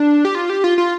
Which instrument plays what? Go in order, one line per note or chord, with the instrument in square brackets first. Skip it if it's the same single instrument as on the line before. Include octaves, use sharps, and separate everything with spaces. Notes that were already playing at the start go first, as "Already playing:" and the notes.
Already playing: [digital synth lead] D4
G4
F4
G4
F4
F4